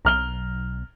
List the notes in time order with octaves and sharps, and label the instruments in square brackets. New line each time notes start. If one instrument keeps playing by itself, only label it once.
[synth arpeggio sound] B1 [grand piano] A#5 F6 G7